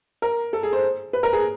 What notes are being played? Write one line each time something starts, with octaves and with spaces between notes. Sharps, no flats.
A#4
A4
G#4
C5
B4
A#4
G#4